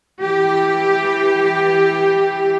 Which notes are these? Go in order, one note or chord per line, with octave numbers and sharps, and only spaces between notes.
E3 G4